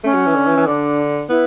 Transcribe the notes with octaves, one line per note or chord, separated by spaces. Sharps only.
A3 C#4
F#3
E3
D3
E3
E3
D3 D4
B3 E4